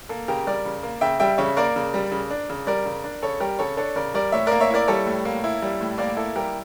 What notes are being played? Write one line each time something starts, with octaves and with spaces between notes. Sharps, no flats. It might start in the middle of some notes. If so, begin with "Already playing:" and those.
A#3 A4
C#3 G4 A#4
G3 A#4 D5
C#3
A#3
C#3 E5 G5
G3 E5 G5
C#3 C#5 E5
A#3 A#4 D5
C#3
G3
C#3
D4
C#3
G3 A#4 D5
C#3
D4
C#3 A4 C#5
G3 G4 A#4
C#3 A4 C#5
D4 A4 C#5
C#3 A#4 D5
G3 A#4 D5
A2 C#5 E5
A#3 A#4 D5
C#5 E5
E4 A#4 D5
G3 A4 C#5
A2
A#3
E4
G3
A2
A#3 A#4 D5
E4 A4
G3 G4 A#4